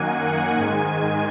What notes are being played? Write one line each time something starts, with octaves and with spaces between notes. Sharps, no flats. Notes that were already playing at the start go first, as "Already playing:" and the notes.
Already playing: F#2 D#3 A#3 F#5 G#5
F#5
G#2 D#3 G#3 G#5